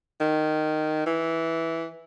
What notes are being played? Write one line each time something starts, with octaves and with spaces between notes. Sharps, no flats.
D#3
E3